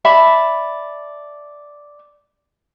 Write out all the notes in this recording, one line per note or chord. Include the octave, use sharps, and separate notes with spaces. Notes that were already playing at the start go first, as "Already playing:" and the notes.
D5 E5 A5 B5